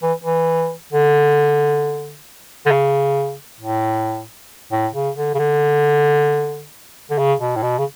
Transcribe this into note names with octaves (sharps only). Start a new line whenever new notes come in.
E3
E3
D3
D3
C#3
A2
A2
C#3
D3
C#3
D3
D3
C#3
B2
A2
B2
C#3